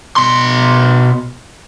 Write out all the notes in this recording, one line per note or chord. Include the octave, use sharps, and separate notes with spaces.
B2 C6